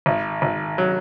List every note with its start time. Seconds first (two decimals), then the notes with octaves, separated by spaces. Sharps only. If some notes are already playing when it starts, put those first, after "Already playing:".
0.06 G#1
0.42 G#1
0.78 F#3